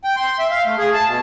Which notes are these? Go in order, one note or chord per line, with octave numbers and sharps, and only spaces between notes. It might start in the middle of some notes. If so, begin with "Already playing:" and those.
G5
C6
E5
F5
A3
G#4
A5
B2